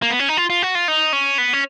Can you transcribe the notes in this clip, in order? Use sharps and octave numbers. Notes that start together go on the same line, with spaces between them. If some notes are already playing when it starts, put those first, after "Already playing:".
A#3
B3
C#4
D#4
F4
F4
F#4
F4
D#4
C#4
B3
C#4